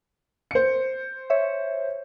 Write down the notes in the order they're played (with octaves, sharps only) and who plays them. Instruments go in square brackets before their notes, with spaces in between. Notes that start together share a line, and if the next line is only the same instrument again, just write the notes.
[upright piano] C5 C#7
[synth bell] C#5 E5